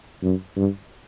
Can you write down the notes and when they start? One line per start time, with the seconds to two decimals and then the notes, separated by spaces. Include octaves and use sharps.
0.23 F#2
0.56 G2